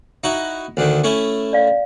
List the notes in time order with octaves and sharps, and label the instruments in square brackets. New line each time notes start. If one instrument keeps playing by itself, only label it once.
[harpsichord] D#4 E4 F#4
D2 D3 D#3
A3 C#4 E4
[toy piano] D5 F5